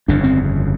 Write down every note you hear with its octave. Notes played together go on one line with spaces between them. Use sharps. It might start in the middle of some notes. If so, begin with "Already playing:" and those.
G1 F2 C#3 D4
C4